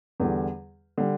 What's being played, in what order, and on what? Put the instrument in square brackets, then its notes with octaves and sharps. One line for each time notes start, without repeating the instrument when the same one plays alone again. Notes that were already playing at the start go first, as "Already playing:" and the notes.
[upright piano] E2 D3 G3
D3 G3